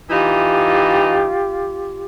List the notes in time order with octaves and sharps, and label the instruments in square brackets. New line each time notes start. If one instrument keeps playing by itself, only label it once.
[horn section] E3 D#4 [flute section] F4 G4